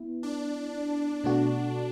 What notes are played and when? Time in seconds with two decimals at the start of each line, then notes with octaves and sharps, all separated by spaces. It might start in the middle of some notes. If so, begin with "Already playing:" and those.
Already playing: B3 E4
0.23 D4
1.24 B2 A3 D4 F#4